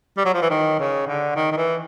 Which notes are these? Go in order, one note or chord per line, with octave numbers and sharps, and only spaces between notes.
G3
F#3
F3
E3
D#3
C#3
D3
D#3
D#3
E3